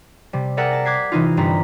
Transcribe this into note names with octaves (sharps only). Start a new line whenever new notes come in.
C3 G3
G#4 A#4 D5 E5 F#5 G5
A5 A#6
D6 F#6 G#6 B6 C7
C3 E3 D#4 F4
G1 G2 G3 C4 A#5 B6